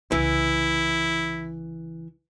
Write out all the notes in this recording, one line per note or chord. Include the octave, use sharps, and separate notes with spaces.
C2 C#3 E3 E4